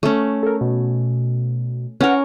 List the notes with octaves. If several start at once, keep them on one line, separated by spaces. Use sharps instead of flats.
A3 C#4
A4 A#4
B2
C#4 A#4 B4 F#5